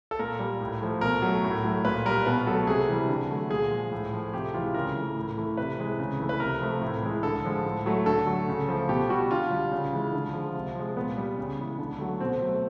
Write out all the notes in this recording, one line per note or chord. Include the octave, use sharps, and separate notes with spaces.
A4
A#2 A#4
G3
A2
F3 A3
B2 A#4
F#3 A3
A2
F#3 A3
A#2 B4
G3 A#4
B2 B4
F#3 A3 A4
C3 G#4
E3 G3
D3
F#3 A3
A#2 G#4
F3 G#3
A2
F3 A3
C3 G4
E3 G#3 F4
C#3 A#4
E3 A3
A2
E3 A3
C3 B4
E3 G#3
C#3
E3 A3
B4
C3 A#4
F3 A3
A2
E3 G#3
D3 A4
F3 G#3
A2
F#3 A3
D3 A4
F#3 A3
C#3
F3 A3
B2 G4
G3 F#4
D3 F4
G3
C#3
E3 G#3
D3
F3 G#3
C3
F3 G#3
A#2 B3
G3
C#3
E3 G#3
D3
F#3 A3
B2 C4
F#3 A3